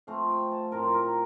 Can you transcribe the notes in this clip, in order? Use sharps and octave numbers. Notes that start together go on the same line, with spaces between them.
F3 A3 C4 F5
G5
A5
A2 F3 C4 A#4
A#4